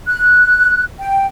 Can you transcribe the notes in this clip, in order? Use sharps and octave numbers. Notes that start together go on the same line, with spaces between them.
F#6
G5